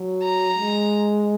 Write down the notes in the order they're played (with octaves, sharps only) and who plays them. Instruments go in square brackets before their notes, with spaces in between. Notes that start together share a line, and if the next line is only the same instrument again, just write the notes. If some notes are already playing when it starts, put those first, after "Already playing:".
Already playing: [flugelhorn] F#3
[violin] A#5
[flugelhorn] G#3